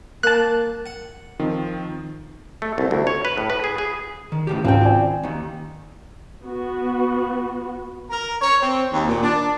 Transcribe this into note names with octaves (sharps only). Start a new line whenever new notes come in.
A#3 A5 F#6
F#5
D#3 F3 C4
A3
C2
D2
C#5
B4
A2
B4
G#4
G#4
D#3
A2 C#3 G4
G#1 C#2 C4 G5
D5 G#5
D#2 D#3
B3 F#4
A#4
C#5
C4
D#2
A#2
D4